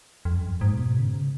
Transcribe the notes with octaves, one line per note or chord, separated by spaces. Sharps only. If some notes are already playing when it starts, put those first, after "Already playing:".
F2
F#2
G#2
B2
C#3